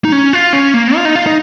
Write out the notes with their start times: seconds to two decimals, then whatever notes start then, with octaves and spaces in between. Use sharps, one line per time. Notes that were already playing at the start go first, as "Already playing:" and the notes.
0.05 D#4
0.12 C#4
0.33 F4
0.53 C#4
0.74 A#3
0.96 F4
1.05 D#4
1.15 F4
1.26 D#4